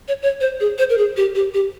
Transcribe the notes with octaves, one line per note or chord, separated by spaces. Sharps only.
C#5
C#5
C5
G#4
C5
A#4
G#4
G4
G4
G4